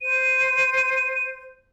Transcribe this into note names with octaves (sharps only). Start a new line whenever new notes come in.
C5 D#7